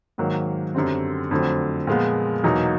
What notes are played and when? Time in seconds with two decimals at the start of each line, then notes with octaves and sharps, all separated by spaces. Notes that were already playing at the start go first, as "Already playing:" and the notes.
0.18 G#2 D#3 F#3 A#3
0.75 F#2 D3 G3 C4
1.31 F2 D3 F#3 A3 C4
1.87 A#2 F3 G#3 B3
2.44 E2 B2 F#3 A#3 D#4